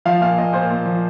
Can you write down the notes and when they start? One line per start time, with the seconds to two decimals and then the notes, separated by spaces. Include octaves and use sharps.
0.05 F3 F5
0.21 A#2 F5
0.38 A#2 D#5
0.53 A#2 C5
0.70 A#2
0.85 F3